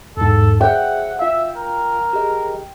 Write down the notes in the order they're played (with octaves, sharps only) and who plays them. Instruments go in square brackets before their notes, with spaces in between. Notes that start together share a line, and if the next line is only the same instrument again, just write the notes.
[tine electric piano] E2 G#2 [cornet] A4
[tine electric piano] G#4 C5 E5 [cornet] F#5 [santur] G5
[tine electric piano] F4 F5 [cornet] E5
[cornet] A#4
[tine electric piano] G4 G#4 D#5